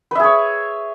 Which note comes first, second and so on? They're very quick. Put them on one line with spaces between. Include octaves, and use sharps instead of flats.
B4 E5 G#4 C#5